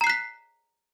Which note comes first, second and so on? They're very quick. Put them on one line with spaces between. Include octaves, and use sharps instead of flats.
A#5 C7 F#6 B6